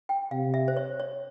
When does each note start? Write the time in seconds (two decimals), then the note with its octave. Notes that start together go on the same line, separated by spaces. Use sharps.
0.09 G5
0.31 C3 F5
0.54 E5
0.68 C5
0.77 C#5
1.00 C#5